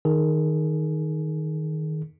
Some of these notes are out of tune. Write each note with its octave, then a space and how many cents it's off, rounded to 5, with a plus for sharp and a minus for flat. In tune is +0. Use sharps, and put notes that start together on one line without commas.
D#3 +0 G#4 +25